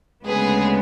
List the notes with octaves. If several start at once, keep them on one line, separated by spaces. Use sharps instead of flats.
D2 C#3 G#3 B3 G#4 B4